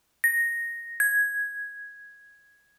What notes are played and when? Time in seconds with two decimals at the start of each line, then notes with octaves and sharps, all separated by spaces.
0.24 A#6
1.00 G#6